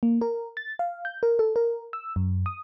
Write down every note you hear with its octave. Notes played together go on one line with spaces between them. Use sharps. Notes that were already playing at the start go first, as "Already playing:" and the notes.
A#3
A#4
A6
F5
G6
A#4
A4
A#4
E6
F#2
D#6